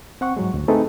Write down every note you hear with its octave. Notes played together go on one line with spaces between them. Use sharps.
C4 F#5 C#6
G#2 F#3 G#3
D2
A3 C4 D#4 G#4 A4 B4